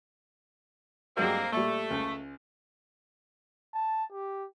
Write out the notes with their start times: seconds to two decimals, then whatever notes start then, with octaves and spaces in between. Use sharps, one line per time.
1.17 G2 F#3 G#3 A#3 C4
1.52 A#2 G3 A3
1.91 C#2
3.74 A5
4.12 G4